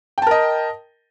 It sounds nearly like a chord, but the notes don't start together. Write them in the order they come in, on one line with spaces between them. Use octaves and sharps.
G5 A5 A#4 D#5